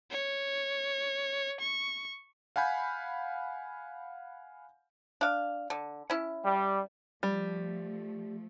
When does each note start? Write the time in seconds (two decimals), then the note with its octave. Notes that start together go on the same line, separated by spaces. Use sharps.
0.11 C#5
1.61 C#6
2.56 F5 F#5 G#5 B5 G6
5.21 D4 F5
5.70 D3
6.10 C#4 E4
6.45 G3
7.23 F3 G3 A3